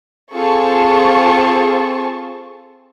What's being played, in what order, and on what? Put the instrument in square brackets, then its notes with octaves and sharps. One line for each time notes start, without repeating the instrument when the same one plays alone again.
[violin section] C4 F4 G#4 A4 A5 C#6